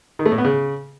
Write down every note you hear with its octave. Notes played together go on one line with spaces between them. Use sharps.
D#3
A3
A2
B3
C#3